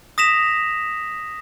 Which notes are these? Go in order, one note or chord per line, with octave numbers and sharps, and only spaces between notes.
D#6 A#6 B6 E7 F7